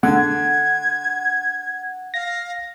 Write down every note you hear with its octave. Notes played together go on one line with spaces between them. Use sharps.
D3 F#5 G#6
F5 A#6